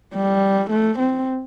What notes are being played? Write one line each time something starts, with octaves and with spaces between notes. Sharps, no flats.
G3
A3
C4